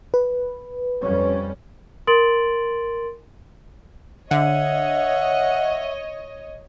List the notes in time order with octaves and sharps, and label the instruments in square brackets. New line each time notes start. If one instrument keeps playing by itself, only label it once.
[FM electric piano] B4
[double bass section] F2 G3 C#4
[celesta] A#4 C6 A6 D7 F#7
[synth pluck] D3 [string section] C#5 D#5 [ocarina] E5 [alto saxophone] F#5